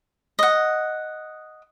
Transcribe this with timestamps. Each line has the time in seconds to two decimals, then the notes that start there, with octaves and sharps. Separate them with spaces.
0.39 D#5 F#5